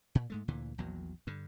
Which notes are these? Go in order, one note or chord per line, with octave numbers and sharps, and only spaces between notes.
A#2
G#2 G#3 A3
D2 A#2 D3 E3
A#1 E2 A#2 F#3
G2 D3